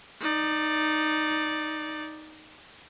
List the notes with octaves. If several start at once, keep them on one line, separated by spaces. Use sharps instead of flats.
D#4 D5